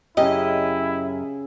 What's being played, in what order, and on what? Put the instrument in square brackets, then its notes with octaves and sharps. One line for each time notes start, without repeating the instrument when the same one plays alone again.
[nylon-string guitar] F#2 G4 [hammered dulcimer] C#3 G#4 F5 [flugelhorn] E4 [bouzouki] D#5